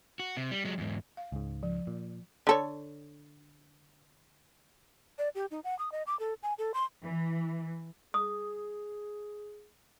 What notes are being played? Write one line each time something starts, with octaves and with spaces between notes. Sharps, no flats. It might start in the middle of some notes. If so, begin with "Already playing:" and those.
F#4
C3
G3
F#3 G#3
E2 G#2
F5
C#2 G#2
F3
A#2
D3 A4 C#5
D5
G4
D#4
F#5
D#6
D#5
D6
A4
G#5
A4
C6
E3
G#4 D#6